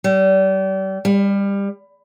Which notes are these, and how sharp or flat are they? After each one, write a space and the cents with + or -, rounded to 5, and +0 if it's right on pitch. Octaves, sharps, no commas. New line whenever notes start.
G3 -35
G3 +25